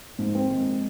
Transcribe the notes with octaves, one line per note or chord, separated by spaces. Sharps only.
G#2 F3 A#3
C4
D#3 G#3 C4